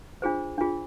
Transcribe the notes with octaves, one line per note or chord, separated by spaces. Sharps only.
D4 F4 G#4 C5
D4 F4 G#4